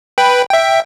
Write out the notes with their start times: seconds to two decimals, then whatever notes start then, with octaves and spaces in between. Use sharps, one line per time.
0.18 B4 G5 B5
0.51 E5 G5